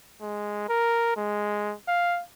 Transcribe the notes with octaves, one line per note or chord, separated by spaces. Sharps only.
G#3
A#4
G#3
F5